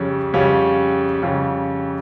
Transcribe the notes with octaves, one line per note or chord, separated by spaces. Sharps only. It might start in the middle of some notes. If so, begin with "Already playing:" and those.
Already playing: F2 C#3 G3 C#4
F2 C#3 G3 C#4 F4
F2 C#3 G3 C#4 F4